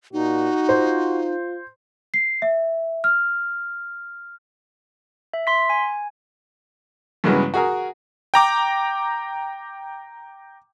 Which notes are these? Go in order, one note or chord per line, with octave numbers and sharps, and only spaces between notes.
A#2 D#4 F#4
F4 C5
C7
E5
F6
E5
C6 B6
G#5
G2 C#3 E3 F#3 G#3 B3
F#4 G#4 A#4
G5 A#5 D6